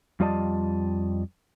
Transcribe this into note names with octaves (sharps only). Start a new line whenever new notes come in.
F2 G3 F4 D5 D#5 A5